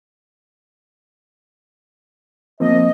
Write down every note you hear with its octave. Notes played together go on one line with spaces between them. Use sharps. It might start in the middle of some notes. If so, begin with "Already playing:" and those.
F3 A#3 C4 D#5